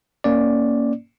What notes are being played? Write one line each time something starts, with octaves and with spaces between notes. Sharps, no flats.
A#3 C#4 D5